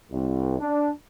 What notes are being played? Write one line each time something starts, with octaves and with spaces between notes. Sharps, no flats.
C2
D4